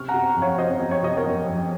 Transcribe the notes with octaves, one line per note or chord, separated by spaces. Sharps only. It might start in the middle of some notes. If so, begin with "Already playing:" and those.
Already playing: C3 C#6 F6
F#5 A#5
C3
F2
C#5 F5
C3 C5 D#5
F2
C#5
C3 D#5
A#4 C#5
F2
F2